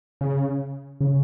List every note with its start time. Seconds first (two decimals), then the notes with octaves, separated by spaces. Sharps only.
0.21 C#3
1.01 C#3